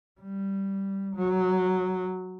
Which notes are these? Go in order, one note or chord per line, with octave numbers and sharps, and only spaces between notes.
G3
F#3